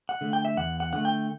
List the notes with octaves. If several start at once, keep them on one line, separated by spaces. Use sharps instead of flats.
F#5
D3 A3
G5
E5
E2 F#5
F#5
D3 A3 F#5
G5